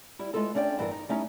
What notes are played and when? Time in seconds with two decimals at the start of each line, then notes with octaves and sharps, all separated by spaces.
0.19 G3 E4
0.34 G#3 A3 B3 F4 A4
0.55 A3 C#4 D4 D5 D#5 G5
0.79 G2 E3 B3 A#4
0.91 D#4
1.09 G3 A3 C#4 D#4 E4